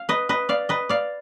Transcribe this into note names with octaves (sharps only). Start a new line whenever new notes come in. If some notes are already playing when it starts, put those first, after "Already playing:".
Already playing: F5
B4 D#5
B4 D#5
D5 F5
B4 D#5
D5 F5